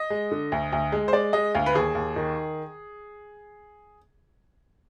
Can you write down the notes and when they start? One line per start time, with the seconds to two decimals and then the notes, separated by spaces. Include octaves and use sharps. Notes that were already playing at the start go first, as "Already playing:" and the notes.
Already playing: D#5
0.10 G#3
0.31 D3
0.52 D2
0.72 D2
0.92 G#3
1.08 C5
1.13 G#3 D5
1.33 G#3 D#5
1.54 D2 F5
1.66 B4
1.75 D#2 G#4
1.95 D#2
2.16 D#3